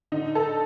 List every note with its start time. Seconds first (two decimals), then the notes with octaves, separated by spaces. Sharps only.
0.12 D3 D#4
0.35 A4